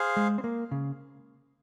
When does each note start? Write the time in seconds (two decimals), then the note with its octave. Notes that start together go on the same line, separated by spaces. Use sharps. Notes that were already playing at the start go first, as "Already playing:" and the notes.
Already playing: G#4 C5 F5
0.17 G#3
0.38 C4
0.44 A#3
0.71 C#3